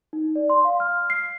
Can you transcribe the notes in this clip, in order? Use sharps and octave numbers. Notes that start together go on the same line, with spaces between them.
D#4
D5
C6
F5
F6
C7